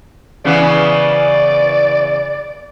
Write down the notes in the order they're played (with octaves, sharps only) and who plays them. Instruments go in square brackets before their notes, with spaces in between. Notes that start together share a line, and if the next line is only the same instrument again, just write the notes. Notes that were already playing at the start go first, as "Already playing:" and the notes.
[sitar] C#3 E3 B3 [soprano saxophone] D5